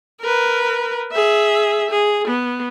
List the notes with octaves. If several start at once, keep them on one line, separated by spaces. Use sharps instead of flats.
A#4 B4
G#4 E5
G#4
B3